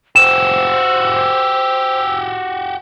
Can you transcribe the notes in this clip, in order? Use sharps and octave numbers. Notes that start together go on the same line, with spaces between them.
F#4 G4 C5 E6 E7